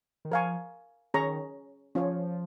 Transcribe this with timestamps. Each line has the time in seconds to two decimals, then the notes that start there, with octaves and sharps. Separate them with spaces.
0.25 D#3
0.31 F3 A#4 F5 G#5 C#6
1.14 D#3 C#4 G#4 C#5 A#5 C#6
1.95 F3 C#4 F4 C#5